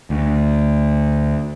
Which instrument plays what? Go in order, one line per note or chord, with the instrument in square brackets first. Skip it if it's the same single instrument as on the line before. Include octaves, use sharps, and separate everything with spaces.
[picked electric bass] D2